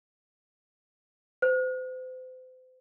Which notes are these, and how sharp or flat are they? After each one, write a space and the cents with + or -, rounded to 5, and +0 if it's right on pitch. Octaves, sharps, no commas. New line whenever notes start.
C5 -35